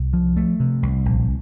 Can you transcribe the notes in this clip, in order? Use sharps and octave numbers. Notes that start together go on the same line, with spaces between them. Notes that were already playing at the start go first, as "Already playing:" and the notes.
Already playing: C2
F3
A3
C3
C2
A#1